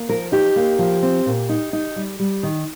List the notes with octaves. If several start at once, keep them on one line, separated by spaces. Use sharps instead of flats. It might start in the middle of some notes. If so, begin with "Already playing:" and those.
Already playing: A#3
F3 A#4
D#4 G4
A#3
F3
C4
A#2
D#4
D#4
G3
G3
D#3